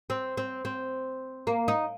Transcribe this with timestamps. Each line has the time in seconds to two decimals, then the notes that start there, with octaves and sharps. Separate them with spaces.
0.10 C4
0.37 C4
0.65 C4
1.47 A#3
1.68 D#4